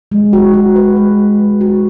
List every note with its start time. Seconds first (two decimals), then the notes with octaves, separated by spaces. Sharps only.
0.12 G#3
0.33 F#4
0.54 F#4
0.76 B4
0.96 G#3
1.19 F#4
1.39 G#3
1.61 F#4